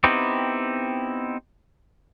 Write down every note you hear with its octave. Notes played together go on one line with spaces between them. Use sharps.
B3 C4 D#4 E4 G4